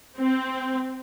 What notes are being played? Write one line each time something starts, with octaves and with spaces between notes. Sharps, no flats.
C4